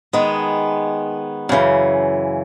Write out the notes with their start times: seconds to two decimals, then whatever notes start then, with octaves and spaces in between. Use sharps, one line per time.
0.13 D#3 G#3 B3
1.49 F#2 C#3 E3